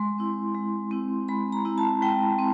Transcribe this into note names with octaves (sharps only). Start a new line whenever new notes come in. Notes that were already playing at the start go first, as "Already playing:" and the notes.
Already playing: G#3 C6
C4 E4
G#3
C4 E4
G#3 B5
A#5
C4 E4
A5
G#3 G5
C4